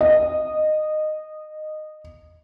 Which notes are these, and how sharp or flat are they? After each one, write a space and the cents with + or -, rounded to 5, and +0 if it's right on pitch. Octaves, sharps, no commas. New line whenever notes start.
D#5 -15